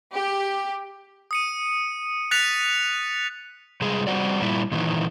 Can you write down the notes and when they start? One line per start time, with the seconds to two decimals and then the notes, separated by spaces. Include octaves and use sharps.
0.12 G4
1.31 D#6 C#7 D#7
2.31 F#6 A6 B6 C#7 F7
3.81 C3 G3 G#3 G#4
4.07 G3 A#3 C4 F#4 D5
4.42 A#2 G3 E4
4.72 A#2 D#3 E3